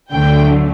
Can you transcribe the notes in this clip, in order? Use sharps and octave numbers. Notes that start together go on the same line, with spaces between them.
D2 D3 F#3 A3 G5